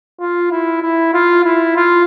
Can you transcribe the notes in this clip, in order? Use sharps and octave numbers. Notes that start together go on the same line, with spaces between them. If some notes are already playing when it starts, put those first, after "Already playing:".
F4
E4
E4
F4
E4
F4